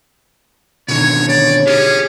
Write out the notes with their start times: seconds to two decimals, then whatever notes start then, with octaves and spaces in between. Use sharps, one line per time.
0.88 B2 D3 D#3 C#5
1.29 C#5 D5
1.67 C#4 G4 G#4